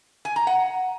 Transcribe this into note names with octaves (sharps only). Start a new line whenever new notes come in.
G#5
A#5
F#5